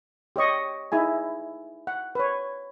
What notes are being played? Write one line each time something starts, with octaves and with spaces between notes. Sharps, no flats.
G4 C#5 D#5 C#6
D#4 E4 G#4 G#5
F#5
B4 C#5